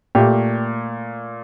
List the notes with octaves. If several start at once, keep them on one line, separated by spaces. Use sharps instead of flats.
A#2 A3 G4